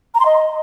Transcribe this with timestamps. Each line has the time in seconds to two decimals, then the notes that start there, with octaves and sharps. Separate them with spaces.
0.15 A#5
0.20 C6
0.26 D#5